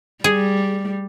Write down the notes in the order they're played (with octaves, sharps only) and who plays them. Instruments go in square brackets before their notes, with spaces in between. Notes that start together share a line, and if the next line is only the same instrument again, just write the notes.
[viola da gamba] G3 [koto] G#4